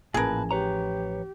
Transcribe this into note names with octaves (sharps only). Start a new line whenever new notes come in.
A1 A#2 F3 G#4 A#4 B4 A5
G4 B4 C#5 A#5